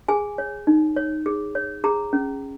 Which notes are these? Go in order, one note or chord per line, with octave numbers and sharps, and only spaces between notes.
G#4 G#5
C#5
D#4
C#5
G#4
C#5
G#4 A#5
C#4